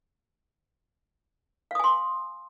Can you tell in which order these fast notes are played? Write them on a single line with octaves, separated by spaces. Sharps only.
F5 D#6 G#5 C6